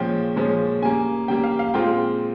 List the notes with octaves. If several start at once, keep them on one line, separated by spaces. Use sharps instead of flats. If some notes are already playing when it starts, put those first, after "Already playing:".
Already playing: A#2 F3 G#3 C#4 G5
A#2 F3 G#3 C#4
C#3 G3 A#3 G#5
C#3 G3 A#3 G5
F5
F5
A#2 G#3 C4 F4 G5